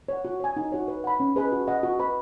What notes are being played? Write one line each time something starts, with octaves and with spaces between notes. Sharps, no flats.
C#5 F#5
F#4
C#5 G#5
D#4
F#4 C#5
B4
F#5 B5
C#4
G#4 B4 D#5 B5
F#4
D#5 F#5
F#4
B4 D#5 B5